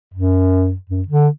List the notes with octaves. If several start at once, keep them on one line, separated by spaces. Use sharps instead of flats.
F#2
F#2
D3